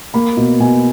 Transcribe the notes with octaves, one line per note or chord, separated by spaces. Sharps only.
A#3 B5
B2
B2 G#5